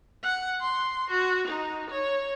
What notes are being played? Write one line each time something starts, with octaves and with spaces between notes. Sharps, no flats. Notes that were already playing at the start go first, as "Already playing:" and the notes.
F#5
C6
F#4
D#4
C#5